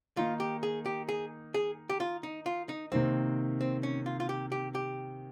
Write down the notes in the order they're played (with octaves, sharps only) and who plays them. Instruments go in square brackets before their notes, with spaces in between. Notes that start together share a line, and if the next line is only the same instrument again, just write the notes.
[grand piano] D#3 A#3 D#4 [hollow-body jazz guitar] F4
[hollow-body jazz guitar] G4
G#4
G4
G#4
G#4
G4
F4
D#4
F4
D#4
[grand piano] C3 D#3 A#3 [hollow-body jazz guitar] C4
[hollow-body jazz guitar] C4
C#4
F4
F4
G4
G4
G4